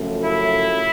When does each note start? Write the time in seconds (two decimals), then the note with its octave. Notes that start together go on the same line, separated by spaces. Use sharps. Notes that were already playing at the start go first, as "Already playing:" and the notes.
Already playing: F#2 C#3 F3 A3
0.23 E4